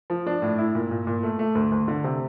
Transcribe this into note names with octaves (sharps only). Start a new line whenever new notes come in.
F3
D4
A2
E4
A#2
A#2
A#2
A3
A3
D2
D2
D3
C3